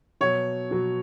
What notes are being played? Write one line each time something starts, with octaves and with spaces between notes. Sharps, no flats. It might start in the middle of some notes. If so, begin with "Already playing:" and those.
B2 F#3 C#5
B2 F#3